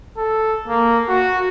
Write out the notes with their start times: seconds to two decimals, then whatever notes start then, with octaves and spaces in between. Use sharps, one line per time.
0.17 A4
0.68 A#3
1.09 F#4